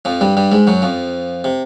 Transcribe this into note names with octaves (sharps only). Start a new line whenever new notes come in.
F2 F3
G2 G3
G2 G3
G#2 G#3
F#2 F#3
F2 F3
C3